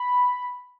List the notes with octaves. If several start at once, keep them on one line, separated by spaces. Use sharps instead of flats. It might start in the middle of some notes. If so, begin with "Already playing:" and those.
Already playing: B5